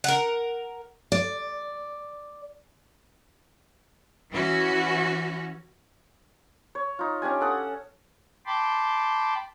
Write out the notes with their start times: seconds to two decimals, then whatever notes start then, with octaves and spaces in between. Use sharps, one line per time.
0.04 A#4 F#5
1.12 D5
4.31 E3 C#4 F#4
6.75 C#5
6.99 D#4 F4
7.22 C#4 D4 G4 G#5
7.41 A4 F#5 D#6
8.46 G5 A5 B5 C6 D6